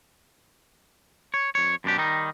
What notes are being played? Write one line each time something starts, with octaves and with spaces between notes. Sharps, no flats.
C#5
F2 C#5
F#2 B2 D4 G4
D#3 G3 D#4